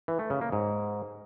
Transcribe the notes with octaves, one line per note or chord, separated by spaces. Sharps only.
E3
A3
C#3
A#3
G#2